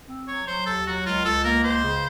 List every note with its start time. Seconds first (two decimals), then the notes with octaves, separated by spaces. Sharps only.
0.08 C4
0.28 F#3 C#5
0.47 F#3 C5
0.66 D#2 A4
0.87 F#3 F#4
1.06 C#2 F4
1.25 C#2 A4
1.44 A#3 A#4
1.64 C#2 C5
1.83 C#3